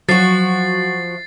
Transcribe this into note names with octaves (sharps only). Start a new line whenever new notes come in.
F3 F#3 F#4 A6 C7